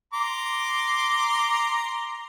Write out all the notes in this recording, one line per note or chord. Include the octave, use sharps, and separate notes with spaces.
A#5 C6 D6